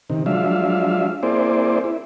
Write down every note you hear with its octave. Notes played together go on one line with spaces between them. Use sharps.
C3 D#3
F3 F#3 G#3 D4 E5 F5
A#3 C4 E4 G#4 C5 D5
E4